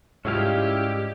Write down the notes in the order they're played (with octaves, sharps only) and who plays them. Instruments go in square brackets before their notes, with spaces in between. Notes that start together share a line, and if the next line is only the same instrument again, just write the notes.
[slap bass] G#2 [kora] F3 G3 D#5 [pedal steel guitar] C#4 E4 F5 [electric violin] G4